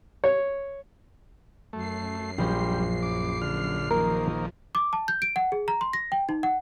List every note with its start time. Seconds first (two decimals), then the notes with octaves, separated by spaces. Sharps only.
0.24 C#5
1.73 F#2 A3 C7
2.38 A#1 G3 C5 B6
3.02 D6
3.42 D3 F6
3.91 D#3 F3 A#3 A#4
4.75 D6
4.93 A5
5.08 G6
5.22 D7
5.36 F#5
5.52 G#4
5.68 A#5
5.81 C6
5.93 A#6
6.12 G5
6.29 D#4
6.43 F#5